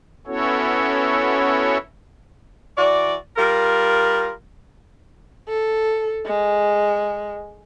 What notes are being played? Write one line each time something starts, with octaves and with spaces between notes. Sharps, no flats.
B3 C#4 E4 F#4 A4 C#5
E3 F#4 D5
G3 F4 A#4
A4
G#3